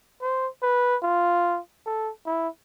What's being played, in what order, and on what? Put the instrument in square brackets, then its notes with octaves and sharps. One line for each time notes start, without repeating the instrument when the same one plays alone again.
[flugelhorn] C5
B4
F4
A4
E4